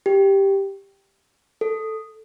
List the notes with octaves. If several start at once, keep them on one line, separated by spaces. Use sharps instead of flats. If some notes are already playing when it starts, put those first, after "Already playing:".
G4
A4